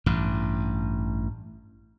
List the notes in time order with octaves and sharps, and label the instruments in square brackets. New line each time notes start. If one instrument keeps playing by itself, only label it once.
[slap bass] A1 G2